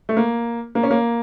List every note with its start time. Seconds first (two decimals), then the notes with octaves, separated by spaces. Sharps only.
0.09 A3
0.17 A#3
0.75 A#3
0.83 C#4
0.91 A#3